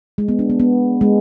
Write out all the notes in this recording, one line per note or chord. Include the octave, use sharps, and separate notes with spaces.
G#3
B3
D4
B3
B3
G#3